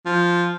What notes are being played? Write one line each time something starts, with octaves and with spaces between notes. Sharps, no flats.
F3